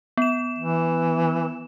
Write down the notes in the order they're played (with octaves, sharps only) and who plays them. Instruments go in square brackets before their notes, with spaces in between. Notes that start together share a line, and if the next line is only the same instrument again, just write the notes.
[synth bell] B3 E7
[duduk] E3